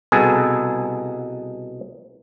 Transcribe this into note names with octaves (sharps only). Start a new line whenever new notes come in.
C2 B2 G#4 A4